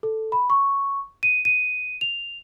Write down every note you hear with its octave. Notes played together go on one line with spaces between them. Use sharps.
A4
B5
C#6
D#7
D#7
F7